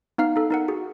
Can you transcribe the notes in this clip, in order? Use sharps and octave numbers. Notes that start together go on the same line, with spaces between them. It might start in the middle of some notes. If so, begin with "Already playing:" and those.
B3 D#4 F5 F6 C7
D#4 A4
D#4 A#4 F#5
F#4 G#4